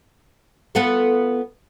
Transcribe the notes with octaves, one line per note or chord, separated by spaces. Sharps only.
B3 F4 A4